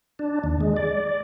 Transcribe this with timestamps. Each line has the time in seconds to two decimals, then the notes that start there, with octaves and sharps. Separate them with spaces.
0.19 D4
0.44 D#2
0.61 G#3
0.76 D5